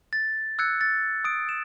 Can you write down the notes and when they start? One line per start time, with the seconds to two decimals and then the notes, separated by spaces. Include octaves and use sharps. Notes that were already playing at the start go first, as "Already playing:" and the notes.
0.13 A6
0.59 E6 F#6 G#6 C#7
0.81 A6
1.24 D#6 D7
1.49 E7